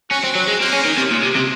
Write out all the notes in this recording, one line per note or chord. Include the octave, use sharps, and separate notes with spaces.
C#4 F#4
C4
F#3
G#3
A#3 C4
C#4
D#3
C3
A#2 G#3
C3
C3